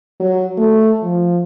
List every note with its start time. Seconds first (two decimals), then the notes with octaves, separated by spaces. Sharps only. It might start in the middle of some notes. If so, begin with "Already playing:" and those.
0.20 F#3
0.58 A3
1.03 F3